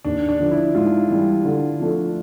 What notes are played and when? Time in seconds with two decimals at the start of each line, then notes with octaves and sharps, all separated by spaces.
0.04 D#2 D4
0.29 D4
0.40 D3 F3
0.51 E4
0.75 G#2 F4
1.10 E3 G3
1.45 D3
1.80 F3 A3 D4